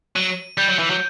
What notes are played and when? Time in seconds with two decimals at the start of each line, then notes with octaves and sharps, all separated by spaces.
0.16 F#3 D#7
0.58 G3 G6
0.68 F#3
0.79 E3
0.90 F#3